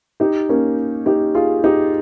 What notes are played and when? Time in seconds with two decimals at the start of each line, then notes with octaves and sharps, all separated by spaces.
0.20 D#4 G4
0.49 A#3 C#4
1.06 D#4 G4
1.35 F4 G#4
1.64 D#4 G4